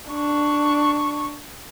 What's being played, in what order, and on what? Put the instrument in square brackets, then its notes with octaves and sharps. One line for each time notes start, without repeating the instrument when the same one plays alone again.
[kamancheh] D4 C#6